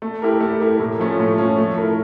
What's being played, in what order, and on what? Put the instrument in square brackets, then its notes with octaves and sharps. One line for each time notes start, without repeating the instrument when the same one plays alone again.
[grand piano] A3
E4 G4 A#4
A3
E4 G4 A#4
A2
F3 A3 C#4
A2
F3 A3 C#4
A3
E4 A#4